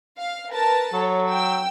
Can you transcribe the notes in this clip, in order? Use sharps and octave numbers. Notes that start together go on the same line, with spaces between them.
F5
A#4 B4 A5
F#3 A4 C#5
G5 E6